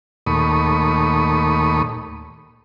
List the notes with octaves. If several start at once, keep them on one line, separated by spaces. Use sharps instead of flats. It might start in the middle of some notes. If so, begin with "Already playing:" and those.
D#2 A#2 A3 B5 C#6 D#6